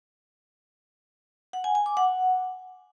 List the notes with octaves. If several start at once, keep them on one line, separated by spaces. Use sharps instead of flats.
F#5
G#5
G#5
D6
F#5